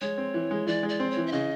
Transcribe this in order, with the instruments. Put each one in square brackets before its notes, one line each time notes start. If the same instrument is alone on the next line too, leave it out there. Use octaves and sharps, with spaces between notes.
[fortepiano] G#3 [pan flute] C#5
[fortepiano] C4
E3
G#3
[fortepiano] E3 [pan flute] D5
[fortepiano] G#3
[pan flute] D5
[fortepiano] C4
[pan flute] C#5
[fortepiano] E3
[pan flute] E5
[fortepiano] C#3 [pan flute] D#5